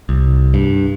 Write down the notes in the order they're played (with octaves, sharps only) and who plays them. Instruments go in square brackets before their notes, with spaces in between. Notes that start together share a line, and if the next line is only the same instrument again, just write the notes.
[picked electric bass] C2
G2